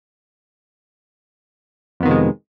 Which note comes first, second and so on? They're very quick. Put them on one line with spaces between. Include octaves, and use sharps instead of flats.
F2 B3 D#3 C3 G#3